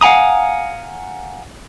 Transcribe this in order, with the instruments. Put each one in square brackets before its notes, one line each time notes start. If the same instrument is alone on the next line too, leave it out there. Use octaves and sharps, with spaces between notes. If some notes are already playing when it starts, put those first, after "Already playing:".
[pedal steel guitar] F5 F#5 G#5 A#5 D#6